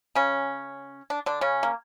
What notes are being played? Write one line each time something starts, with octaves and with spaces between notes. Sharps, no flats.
C#3 C#4
D4
D3 D4
C#3 C#4
A#3